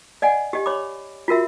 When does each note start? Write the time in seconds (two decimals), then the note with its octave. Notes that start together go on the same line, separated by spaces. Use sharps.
0.22 D5 D#5 F#5 G#5
0.53 G4 D#5
0.66 C#5 B5 D6
1.28 F4 F#4 A#4 E5